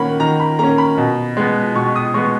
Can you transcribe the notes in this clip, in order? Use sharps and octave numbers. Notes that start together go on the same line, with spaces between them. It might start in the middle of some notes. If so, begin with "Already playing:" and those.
Already playing: D#3 A#3 C#4 F#5 B5
D#3 A#5
B5
A#3 C#4 A#5
B5
B2
G#3 B3
B2 C#6
D#6
G#3 B3 C#6